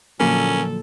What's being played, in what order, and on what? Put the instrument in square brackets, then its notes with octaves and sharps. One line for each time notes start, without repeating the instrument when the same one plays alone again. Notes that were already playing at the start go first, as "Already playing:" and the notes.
[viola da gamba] A#2 A4 [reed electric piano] D3 F3 F#3 [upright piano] A#3 [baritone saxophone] C#4